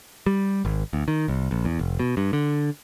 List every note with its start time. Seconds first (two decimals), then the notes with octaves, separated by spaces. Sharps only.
0.26 G3
0.65 G#1
0.93 D2
1.08 D#3
1.28 C2
1.51 A#1
1.65 E2
1.79 F1
1.99 B2
2.17 G2
2.33 D3